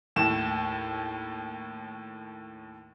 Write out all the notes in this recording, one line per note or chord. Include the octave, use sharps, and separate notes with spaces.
D#2 A2 E7